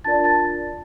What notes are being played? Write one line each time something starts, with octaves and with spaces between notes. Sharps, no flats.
D4 F4 A#4 D5 A5 A6
A5 A6